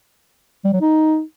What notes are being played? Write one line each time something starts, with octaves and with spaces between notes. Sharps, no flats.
G3
F#3
D#4